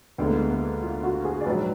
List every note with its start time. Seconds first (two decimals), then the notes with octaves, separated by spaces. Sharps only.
0.18 D2 D3 G#3 B3
0.27 A#3
0.35 B3
0.50 A#3
0.82 F4
1.03 F#4
1.25 G#4
1.41 D5
1.46 A#1 G#2 F#3 D4 B4